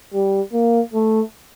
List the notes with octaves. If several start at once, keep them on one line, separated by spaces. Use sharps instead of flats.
G3
A#3
A3